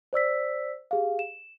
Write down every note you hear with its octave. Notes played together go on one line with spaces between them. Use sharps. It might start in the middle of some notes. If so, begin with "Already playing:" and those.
C5 D5 E6 B6
G4 G#4 F5
E7